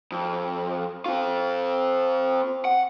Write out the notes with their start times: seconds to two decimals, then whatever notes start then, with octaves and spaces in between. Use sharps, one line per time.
0.12 F2
1.06 C4 F4
2.65 F#5